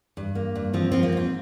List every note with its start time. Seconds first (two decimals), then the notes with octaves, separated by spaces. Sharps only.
0.17 G2
0.35 A#3
0.55 G2
0.73 F3 C4
0.92 F3 C4
1.03 A#3
1.12 G#2 C4